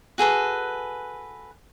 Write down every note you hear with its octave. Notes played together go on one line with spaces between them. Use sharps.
F#4 G#4 A4 B4